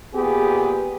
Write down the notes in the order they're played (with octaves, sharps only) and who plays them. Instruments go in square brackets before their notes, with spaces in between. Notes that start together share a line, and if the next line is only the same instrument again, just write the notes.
[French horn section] A#2 B3 G4 G#4